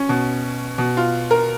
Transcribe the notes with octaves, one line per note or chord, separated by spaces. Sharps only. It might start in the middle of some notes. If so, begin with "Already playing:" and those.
Already playing: C#4
B2
B2
F4
A#4